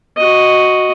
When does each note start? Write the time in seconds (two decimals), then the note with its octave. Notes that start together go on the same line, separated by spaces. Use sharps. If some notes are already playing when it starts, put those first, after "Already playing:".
0.17 F#4 D#5